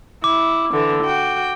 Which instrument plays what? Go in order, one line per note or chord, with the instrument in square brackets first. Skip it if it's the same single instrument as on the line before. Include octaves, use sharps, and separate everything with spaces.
[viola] E4 [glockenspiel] D6
[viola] D3 E3
F#4 G5